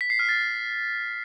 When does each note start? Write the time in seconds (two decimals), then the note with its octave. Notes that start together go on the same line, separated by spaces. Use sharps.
0.01 B6
0.10 C7
0.19 F6
0.29 A6